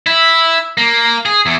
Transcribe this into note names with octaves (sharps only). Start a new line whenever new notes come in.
E4
A#3
G#4
E2